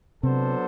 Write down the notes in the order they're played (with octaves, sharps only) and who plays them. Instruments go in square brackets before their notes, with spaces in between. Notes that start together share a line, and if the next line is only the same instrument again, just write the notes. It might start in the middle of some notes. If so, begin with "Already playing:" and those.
[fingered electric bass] C3 [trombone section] F#3 B3 D4 A4 C5